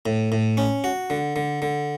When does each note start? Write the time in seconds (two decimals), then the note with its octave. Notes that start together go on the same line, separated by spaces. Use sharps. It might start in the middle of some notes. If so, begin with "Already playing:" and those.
0.06 A2
0.32 A2
0.57 C#4
0.84 F#4
1.10 D3
1.36 D3
1.62 D3